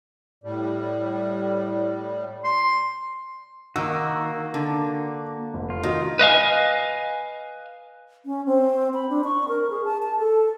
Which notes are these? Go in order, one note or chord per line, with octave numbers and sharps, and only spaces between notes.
A2 G3
C6
D#3 A#3 F#4 E6
D3
F1
F4
D#3 D#4 F#4
B4 D#5 F5 G#5
C#4
C4
B5
D4
C#6
A#4
G#4
A5
A5
A4